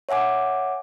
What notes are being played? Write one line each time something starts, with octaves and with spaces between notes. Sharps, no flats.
C#5 E5 F#5 G#5 D6